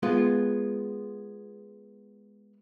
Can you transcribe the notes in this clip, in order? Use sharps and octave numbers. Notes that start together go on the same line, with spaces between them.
G#3 B3 F4